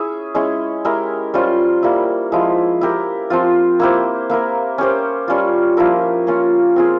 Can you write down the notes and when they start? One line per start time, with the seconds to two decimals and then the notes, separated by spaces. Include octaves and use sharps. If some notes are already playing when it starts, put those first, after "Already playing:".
Already playing: C#4 E4 G#4 E5
0.35 G#3 C#4 E4 G#4
0.85 G#3 E4 G4 A#4
1.34 G3 C#4 F4 C5
1.83 G3 A#3 E4
2.32 F3 G#3 E4
2.81 E4 G4 A#4
3.30 F3 C4 F4
3.80 A#3 E4 G4 C5
4.30 A#3 E4 A#4
4.78 C#4 G4 C5
5.28 G3 C#4 F4
5.77 F3 A#3 E4 A#4
6.27 A#3 C#4 F4
6.76 C4 F4 G#4